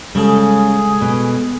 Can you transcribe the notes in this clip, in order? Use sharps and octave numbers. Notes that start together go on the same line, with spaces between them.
C#3 G3 G#3 G#4 A4
B2